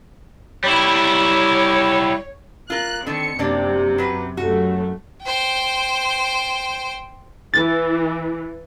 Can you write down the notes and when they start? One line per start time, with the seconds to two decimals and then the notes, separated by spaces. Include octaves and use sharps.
0.64 G3 E4 C#5
2.70 F4 A#4 F#6
3.07 D3 D#3 C4 C#7
3.39 F#2 C3 A#3 D4 D5
3.98 F#3 B4
4.37 F#2 A3 F#4
5.23 C5 G5
7.54 E3 A6